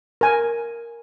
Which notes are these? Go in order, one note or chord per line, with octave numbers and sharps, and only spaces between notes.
A#4 G#5